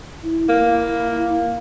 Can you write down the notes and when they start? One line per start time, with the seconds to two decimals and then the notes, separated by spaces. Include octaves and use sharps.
0.23 E4
0.49 A#3 E4